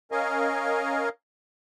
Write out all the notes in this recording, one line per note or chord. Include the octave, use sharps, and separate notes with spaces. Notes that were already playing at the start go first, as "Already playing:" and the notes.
C#4 A#4 D#5 F5 G#5